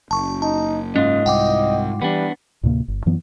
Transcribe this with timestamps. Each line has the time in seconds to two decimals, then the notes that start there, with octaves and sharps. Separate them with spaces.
0.11 F#1 A5 C#6
0.42 D#4 A5
0.96 G#2 C#4 F4 D#5
1.26 C2 F#5 G5 D6
2.02 E3 G3 B3 D4
2.63 D2 A2 C3 A#3
2.88 G1
3.06 F#2 E3 F#3 B3